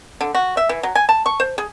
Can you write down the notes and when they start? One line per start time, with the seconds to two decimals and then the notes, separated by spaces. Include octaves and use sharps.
0.21 D3
0.35 F#4
0.57 E5
0.69 E3
0.83 F#3
0.95 G#5
1.09 A5
1.26 C#6
1.40 C5
1.58 G#4